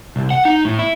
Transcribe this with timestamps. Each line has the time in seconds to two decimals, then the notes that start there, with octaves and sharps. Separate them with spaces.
0.16 C2
0.30 F#5
0.45 D#4
0.65 A2
0.79 E4